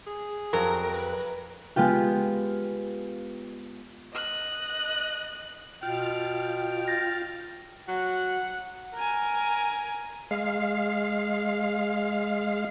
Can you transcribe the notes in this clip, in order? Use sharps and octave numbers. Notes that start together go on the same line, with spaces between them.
G#4
F2 F#3 A#4
B4
G#3 B3 F4 G4
D#5 F#6
B2 F4 G5 F6
A6 A#6
F#3 F#5
A#4 G#5
G#3 F5